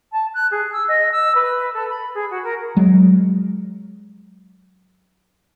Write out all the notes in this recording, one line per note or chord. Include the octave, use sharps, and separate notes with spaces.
A5
F#6
G#4
E6
D#5
E6
B4
A4
B5
G#4
F#4
A#4
F#3 G#3